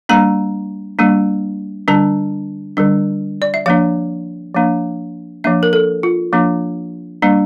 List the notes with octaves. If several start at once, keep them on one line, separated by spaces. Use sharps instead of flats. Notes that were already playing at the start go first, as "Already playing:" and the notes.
G3 A#3 D4 A#5
G3 A#3 D4
D3 G3 D4 A5
D3 G3 D4
D5
E5
F3 A#3 D4 F5
F3 A#3 D4
F3 A#3 D4 E5
A#4
A4
F4
F3 A#3 D4
G3 A#3 D4